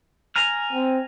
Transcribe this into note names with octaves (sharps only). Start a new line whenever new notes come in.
G#5 A#5 F6
C4